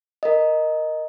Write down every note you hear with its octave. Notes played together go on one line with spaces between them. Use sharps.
A#4 D#5